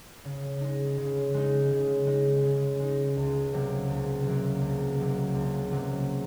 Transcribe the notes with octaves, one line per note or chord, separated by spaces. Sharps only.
C#3
G#3 D#4
C#3
G#3 D#4
C#3
G#3 D#4
C#3
G#3 D#4
C#2
C3 F#3 A#3
C#2
C3 F#3 A#3
C#2
C3 F#3 A#3
C#2
C3 F#3 A#3